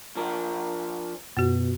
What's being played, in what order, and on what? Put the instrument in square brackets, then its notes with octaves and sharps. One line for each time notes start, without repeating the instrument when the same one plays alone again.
[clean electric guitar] F3 D4 A#4
[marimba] F#2 F#4 [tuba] B2